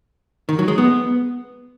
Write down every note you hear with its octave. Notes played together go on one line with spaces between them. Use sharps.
D#3
F#3
G#3
B3